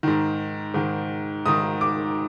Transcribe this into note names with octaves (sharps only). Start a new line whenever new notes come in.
G#2 D#3
G#2 D#3
G#2 D#3 D#6
D6